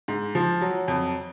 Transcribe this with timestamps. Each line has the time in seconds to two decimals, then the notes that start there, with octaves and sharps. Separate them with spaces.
0.08 G#2
0.35 F3
0.61 F#3
0.88 F2